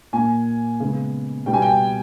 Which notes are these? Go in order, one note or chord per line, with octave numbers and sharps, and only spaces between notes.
A#2 A#3 G#5
C#3 G#3 B3
B2 G3 B3 G5
G#5
G5